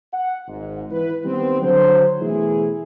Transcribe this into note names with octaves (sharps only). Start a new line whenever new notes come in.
F#5
G#1 G#2
E3 B4
D#3 G3 B3 C4
D3 F#3 C5
B2 E3 A3 E4 G#4